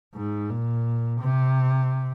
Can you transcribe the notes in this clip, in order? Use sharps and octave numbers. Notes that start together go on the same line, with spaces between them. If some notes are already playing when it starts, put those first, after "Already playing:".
G#2
A#2
C3